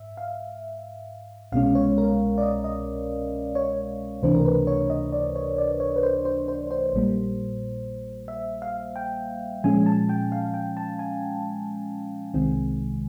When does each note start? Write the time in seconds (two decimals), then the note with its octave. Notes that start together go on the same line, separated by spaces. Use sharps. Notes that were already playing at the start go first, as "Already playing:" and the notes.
Already playing: G#2 E5
0.17 F5
1.52 C2 B2 G#3 C#4 F5
1.75 C#5
1.98 A#4
2.38 D5
2.42 D#5
2.64 D#5
3.55 C#5
4.22 C#2 C3 E3 A3 D4 C5
4.35 A#4
4.46 B4
4.67 C#5
4.90 D#5
5.12 D5
5.35 C#5
5.58 D5
5.80 C#5
5.96 B4
6.03 C5
6.25 C5
6.48 C5
6.71 C5
6.93 A#1 A#2 G3 A#3
8.28 E5
8.62 F5
8.96 G5
9.64 A#2 F3 G#3 C#4 G#5
9.86 A5
10.09 G5
10.32 F5
10.54 G5
10.77 A5
10.99 G#5
12.34 C2 C3 D#3 G#3 C4